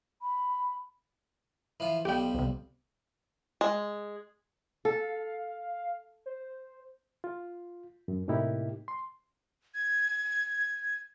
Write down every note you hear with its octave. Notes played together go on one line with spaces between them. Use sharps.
B5
E3 F3 F4
B1 F3 G3 G4 G5
C2 C3
G#3
A4 F5
C5
F4
F#2
A2 C3 A#3 D#4 E4 G4
C6
G#6